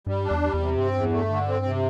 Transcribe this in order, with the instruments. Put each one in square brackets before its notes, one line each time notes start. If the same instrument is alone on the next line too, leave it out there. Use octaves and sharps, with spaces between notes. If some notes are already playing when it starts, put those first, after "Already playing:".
[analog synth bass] G2 [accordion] G3
[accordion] D4
[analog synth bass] E2
[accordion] G3
[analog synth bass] E2
[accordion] C3
[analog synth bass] G2 [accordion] C4
[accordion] E2
A3
D3
C4
C3